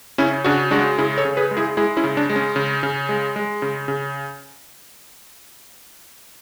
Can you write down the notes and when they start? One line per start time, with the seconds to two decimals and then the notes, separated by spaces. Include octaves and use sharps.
0.18 C#3 C#4 E4
0.44 C#3 D4 F#4
0.71 G#3 D4 F#4
0.98 C#3 E4 G#4
1.18 A4 C#5
1.25 C#3
1.37 G#4 B4
1.51 G#3
1.57 E4 G#4
1.77 G#3 E4 G#4
1.97 C#4 E4
2.04 C#3
2.17 D4
2.30 G#3
2.36 C#4
2.56 C#3
2.83 C#3
3.09 G#3
3.36 G#3
3.62 C#3
3.88 C#3